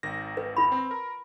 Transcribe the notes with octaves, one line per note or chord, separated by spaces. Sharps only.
G#1 D#3 A#6
B4
F4 B5
C4
A#4